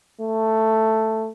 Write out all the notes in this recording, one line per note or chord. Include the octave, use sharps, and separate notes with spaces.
A3